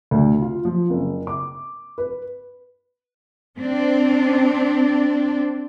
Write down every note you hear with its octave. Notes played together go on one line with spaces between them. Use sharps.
D2
F4
F3
F#1
D6
B4
C4 D4